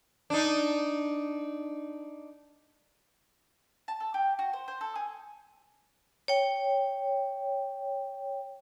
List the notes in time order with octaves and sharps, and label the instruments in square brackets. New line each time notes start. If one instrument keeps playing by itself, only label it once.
[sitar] D4 D#4
[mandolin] A5
A4
G4
F#4
C5
C5
A4
G#4
[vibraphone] C#5 G5